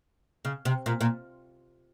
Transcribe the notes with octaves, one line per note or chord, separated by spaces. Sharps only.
C#3
C3
A#2
A#2